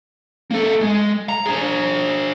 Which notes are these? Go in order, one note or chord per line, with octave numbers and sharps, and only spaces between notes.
A#3 A4
G#3
A#5
D4 G#4